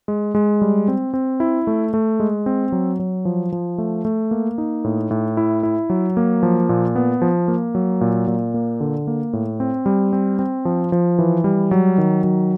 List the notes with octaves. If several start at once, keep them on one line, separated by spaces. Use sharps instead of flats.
G#3
G#3
G3
C4
C4
E4
A3
A3
G#3
C4
F#3
F#3
F3
F3
A3
A3
A#3
D#4
A2
A2
E4
E4
F#3
A#3
F3
A#2
B3
F3
A#3
F#3
A#2
A#2
A#3
D3
A#3
A2
C4
G3
C4
C4
F3
F3
E3
G3
F#3
D#3
F#3